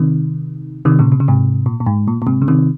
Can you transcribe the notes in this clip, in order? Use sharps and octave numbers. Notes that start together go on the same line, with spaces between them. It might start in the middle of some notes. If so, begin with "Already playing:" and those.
Already playing: C3 D#3
C3 D#3
A#2 C#3
C3
C#3
G#2 C3
A#2
A#2
G#2
A#2
A#2
G#2 C3
C#3
C3 D#3